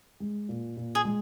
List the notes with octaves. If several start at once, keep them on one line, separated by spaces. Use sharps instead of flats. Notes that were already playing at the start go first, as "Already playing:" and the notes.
G#3
A#2
A#2
G#4
G#3